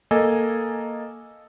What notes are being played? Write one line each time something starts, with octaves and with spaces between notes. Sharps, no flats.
A#3 A4 D#5 G#5